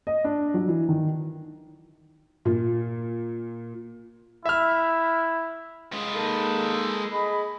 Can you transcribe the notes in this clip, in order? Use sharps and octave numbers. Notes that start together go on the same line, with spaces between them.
D#5
D4
F#3
E3
D#3
A#2 F4
E4 E5 F6
G#3 B4
A#3 D#4 A4
G#4 D#5 B5